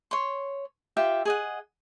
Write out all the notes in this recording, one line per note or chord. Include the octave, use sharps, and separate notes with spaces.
C#5 C6
F4 G4 E5 G5
G#4 D#5 F#5